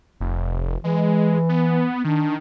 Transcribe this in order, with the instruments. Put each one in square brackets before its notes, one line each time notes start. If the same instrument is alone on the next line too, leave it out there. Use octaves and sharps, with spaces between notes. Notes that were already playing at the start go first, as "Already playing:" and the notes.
[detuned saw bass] F1
[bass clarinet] E3 [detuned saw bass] G#3
[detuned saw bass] B3
[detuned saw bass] D#3 [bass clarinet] D4